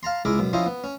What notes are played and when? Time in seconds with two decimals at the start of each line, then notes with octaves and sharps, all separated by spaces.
0.03 F5 A5 A#5 C6
0.25 C#2 G#3 E4 A#4 E5 D6
0.39 F#2 B2
0.53 F3 C#4 E4 C5 D#5
0.66 B3
0.84 C#4